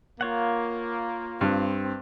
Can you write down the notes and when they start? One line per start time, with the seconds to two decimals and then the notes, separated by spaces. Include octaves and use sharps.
0.21 A#3 F4 C#5 F#5
1.41 G2 C4